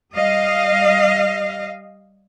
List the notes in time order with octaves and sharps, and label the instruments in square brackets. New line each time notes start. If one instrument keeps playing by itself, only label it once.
[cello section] G3 D#5 F5